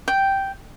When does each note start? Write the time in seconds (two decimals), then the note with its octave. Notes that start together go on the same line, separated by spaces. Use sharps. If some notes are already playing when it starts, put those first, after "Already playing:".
0.08 G5